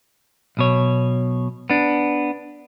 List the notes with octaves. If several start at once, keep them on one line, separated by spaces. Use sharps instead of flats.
B1 B2 C#5
B3 D4